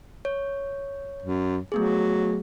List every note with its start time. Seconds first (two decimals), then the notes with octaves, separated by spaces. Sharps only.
0.25 C#5
1.22 F#2
1.72 F#3 A3 B3 G#4